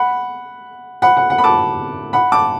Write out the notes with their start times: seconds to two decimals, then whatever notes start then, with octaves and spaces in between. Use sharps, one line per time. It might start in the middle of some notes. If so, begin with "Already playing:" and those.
Already playing: F#5 B5
1.02 F#5 B5
1.17 F#5
1.30 F#5
1.38 B5
1.44 A5 D6
2.13 F#5 B5
2.32 A5 D6